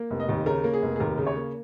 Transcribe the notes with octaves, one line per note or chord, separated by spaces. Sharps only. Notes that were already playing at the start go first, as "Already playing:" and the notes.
Already playing: A#3
F1
D#5
D#2
C#3 A#4
A#3
G#4
F1
G#4
D#2 A#4
C#3
C#5
A#3